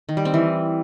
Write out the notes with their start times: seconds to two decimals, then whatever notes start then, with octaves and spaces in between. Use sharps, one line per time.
0.09 D#3
0.17 G3
0.25 C4
0.34 E3